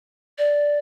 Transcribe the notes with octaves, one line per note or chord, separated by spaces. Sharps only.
D5